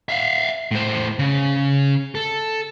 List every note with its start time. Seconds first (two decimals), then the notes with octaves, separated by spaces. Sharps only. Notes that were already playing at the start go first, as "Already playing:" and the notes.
0.09 E5 F5
0.71 A2 C5
1.19 C#3
2.15 A4